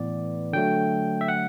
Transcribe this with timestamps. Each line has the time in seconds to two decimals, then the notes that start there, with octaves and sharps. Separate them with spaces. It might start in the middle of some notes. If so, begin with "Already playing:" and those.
Already playing: A2 E3 B3 D5
0.53 D3 F#3 A3 G5
1.21 E5
1.28 F#5